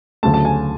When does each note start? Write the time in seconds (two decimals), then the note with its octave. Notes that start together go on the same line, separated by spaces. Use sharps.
0.23 D2 C#3 F#3 A3 A5
0.34 A5
0.45 G#5